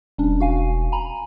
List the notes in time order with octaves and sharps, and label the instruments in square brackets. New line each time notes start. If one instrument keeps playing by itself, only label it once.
[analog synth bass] E1 [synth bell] G3 C#4 D4
[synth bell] F#4 F5 G#5
G#5 A#5 B5